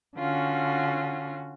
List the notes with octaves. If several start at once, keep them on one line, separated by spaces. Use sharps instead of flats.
D3 C#4 F4 F#4